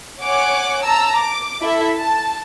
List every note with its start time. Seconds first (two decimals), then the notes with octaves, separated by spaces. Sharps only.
0.22 C#5 F#5 G#5 D6
0.84 A5 A#5 E6
1.17 D6
1.61 E4 A4 E5
1.98 A5